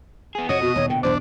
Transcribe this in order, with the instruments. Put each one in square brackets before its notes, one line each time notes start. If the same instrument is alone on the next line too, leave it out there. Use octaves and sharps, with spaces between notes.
[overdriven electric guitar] B3 G#4
[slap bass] F2 C3 [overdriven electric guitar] F#4 [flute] C#5 [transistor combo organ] D#5
[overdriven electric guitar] B2 [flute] F#4
[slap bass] D#1 D#2 [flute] C#5
[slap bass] A#2 D3 [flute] G5
[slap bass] B1 E2 G2 [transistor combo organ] D4 [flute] C5